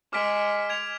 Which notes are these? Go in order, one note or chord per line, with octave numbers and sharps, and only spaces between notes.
G#3 D6 F6 B6 D7
G#6 D7 F7